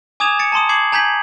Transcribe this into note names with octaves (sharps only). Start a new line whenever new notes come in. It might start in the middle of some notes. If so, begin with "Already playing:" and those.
G#5 D6 D#6 G#6 E7 F7
A6 C#7 D7
A5 A#5 C6 D#6
D6 G#6 C7 F#7
G#5 A#5 G6 G#6 B6 F#7